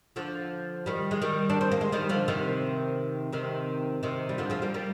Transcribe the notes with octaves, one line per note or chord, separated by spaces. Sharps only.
D3 F3
D#3 G3
G#3
D#3 G3
D4
C4
A#3
G#3
D#3 G3
D3 F3
C3 D#3
C3 D#3
C3 D#3
G3
D3 F3
F3 G#3
G3 A#3
G3 A#3